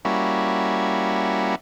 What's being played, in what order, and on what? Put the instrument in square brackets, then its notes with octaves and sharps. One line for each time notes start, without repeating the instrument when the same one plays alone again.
[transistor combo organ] G3 A#3 C#4 E4 F#4